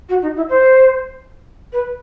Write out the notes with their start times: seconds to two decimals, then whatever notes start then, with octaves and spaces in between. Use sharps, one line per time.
0.09 F#4
0.22 D#4
0.36 E4
0.49 C5
1.73 B4